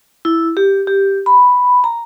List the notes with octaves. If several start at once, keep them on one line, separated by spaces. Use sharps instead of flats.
E4
G4
G4
B5
A#5